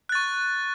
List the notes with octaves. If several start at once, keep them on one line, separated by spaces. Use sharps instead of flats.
C#6 F#6 A6